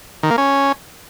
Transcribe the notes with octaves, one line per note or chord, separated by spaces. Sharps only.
D#3
A#3
C#4